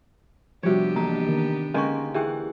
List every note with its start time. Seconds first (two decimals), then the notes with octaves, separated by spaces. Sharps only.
0.63 C3 F3 G3 B3 D4 F#4 G4 C#5
0.96 E3 A#3 A#5
1.28 D#3
1.74 D3 D#3 G#3 A#3 C#4 D#5 C#6
2.14 E3 G4 G#4 G5